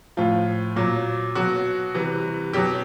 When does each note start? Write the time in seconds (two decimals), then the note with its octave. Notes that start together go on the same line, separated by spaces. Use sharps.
0.17 A2 F3 F4
0.76 A#2 F#3
1.35 B2 F#3 F#4
1.95 C3 E3 G3
2.53 B2 F#3 G4